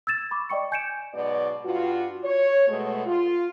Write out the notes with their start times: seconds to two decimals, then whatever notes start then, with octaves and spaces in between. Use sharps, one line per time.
0.07 E6 G#6 A6 E7
0.31 B5 C#6 D6
0.50 D5 D#5 G5 C#6 C#7
0.72 G#5 G6 G#6 C#7 D7 E7
1.13 G#2 B2 F#3 D5
1.64 G2 F4 F#4
2.23 C#5
2.67 B2 G#3 A3
3.05 F4